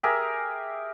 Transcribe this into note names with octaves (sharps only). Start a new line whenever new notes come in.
G4 G#4 A#4 E5